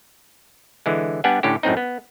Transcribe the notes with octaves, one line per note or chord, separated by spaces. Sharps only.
D3 E3 G#3
G3 B3 D4 G4 F#5 G#5
A2 D3 C#4 G4
F#2 A2 C4 D#4
B3